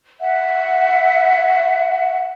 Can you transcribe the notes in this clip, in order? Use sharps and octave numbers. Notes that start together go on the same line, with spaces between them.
E5 F#5